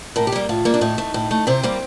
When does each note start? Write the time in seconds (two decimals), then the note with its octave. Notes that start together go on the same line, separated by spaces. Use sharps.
0.16 A2 A#4
0.27 G4
0.32 G3 A#3
0.49 A2 F4
0.65 G3 A#3
0.74 D4
0.81 A2 D#4
0.98 A3
1.14 A2
1.31 A3
1.47 C3 C4
1.63 G3 A#3